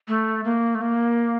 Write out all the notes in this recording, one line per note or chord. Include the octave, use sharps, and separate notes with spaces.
A3
A#3
A3
A#3